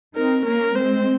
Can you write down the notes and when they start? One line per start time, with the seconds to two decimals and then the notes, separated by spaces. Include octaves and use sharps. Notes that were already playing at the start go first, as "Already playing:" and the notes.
0.15 C4 D#4 A#4
0.45 A#3 C#4 A#4
0.75 G#3 C4 C5